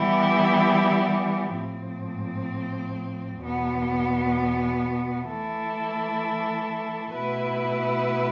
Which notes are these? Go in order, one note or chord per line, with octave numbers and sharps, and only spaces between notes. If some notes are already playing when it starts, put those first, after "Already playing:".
Already playing: E3 G3 B3 E4 G4
A2 F3 C4
E2 B2 B3
E3 A3 E4 A4
B2 A3 E4 B4